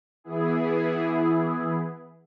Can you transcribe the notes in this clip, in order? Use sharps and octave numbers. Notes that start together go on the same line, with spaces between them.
E3 B3 E4 G#4